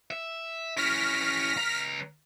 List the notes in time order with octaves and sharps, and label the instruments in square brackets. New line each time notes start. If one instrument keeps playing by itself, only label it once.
[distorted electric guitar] E5
[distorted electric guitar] C#4 E4 [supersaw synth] F6 A#6 B6
[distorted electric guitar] C#2 A#5